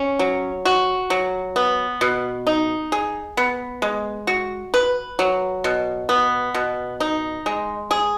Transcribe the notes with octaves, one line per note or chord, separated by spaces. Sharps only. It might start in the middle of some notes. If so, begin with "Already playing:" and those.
Already playing: C#4
F#3
F#4
F#3
B3
B2
D#4
G#4
B3
G#3
F#4
B4
F#3
B2
B3
B2
D#4
G#3
G#4